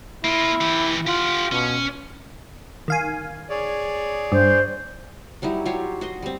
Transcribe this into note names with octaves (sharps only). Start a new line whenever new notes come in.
A#3 E4 F4
E3 G4
F4 G4 F#5
B2 C#4
D#3 F5 G#5
G#4 C#5 D5
G2 C5
F#3 G3 D#4 E4
F#3 F4 G4 C#5
F#4 D#5 C6
G3 C4